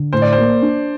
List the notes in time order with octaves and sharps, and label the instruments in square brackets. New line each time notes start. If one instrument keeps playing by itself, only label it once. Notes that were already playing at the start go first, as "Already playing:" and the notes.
Already playing: [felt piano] D3
[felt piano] A2 [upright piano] C5
[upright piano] D5
[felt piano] A#3 [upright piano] C5
[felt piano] D4